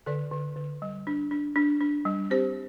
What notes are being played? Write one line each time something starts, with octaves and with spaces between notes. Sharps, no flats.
D3 A4 D5
D3
D3
G3
D4
D4
D4
D4
G3
C4 G4 C5